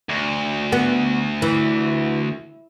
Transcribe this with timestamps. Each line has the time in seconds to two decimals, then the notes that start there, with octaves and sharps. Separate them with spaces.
0.09 D2
0.72 B3
1.42 E3